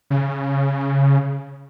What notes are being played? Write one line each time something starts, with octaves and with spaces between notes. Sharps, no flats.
C#3